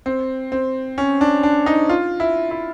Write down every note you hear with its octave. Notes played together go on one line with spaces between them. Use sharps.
C4
C4
C#4
D4
D4
D#4
F4
E4
E4